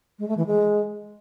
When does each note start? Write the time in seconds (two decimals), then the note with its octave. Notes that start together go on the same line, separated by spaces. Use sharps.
0.19 G#3
0.28 A3
0.37 E3
0.46 G#3